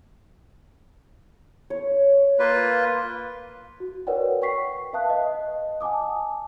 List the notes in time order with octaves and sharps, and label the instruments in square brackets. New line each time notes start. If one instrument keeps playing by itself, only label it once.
[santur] C#5
[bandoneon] A#3 F4 B4
[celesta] F#4
A#4 B4 C#5 D5 F#5 G5
G5 C#6 B6 C7
B4 E5 F5 A5 D#6 F#6
D#5
F#5 G#5 A5 D6 D#6